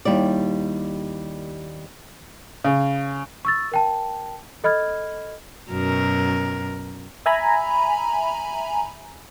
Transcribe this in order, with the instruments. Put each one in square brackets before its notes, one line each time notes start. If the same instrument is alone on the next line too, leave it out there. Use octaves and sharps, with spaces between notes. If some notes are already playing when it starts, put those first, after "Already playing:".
[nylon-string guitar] D#2 G3 E4 D5
[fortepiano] C#3
[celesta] C#6 E6 A6
A#4 G5 A5
A4 D#5 B5 F6 G#6
[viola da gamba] F#2 B2 A#4
[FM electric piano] E5 G#5 A#5 B5